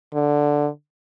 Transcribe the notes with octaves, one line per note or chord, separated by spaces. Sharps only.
D3